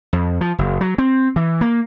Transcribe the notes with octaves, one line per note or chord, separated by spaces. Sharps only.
F2
F3
F#1
F#3
C4
E3
A#3